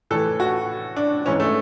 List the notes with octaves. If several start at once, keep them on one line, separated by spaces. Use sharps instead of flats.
A2 E3 A4
F#4
D4
G#2 E3 C#4
A3